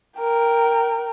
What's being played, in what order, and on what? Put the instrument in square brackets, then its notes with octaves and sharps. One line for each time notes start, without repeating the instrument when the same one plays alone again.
[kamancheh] A#4 G5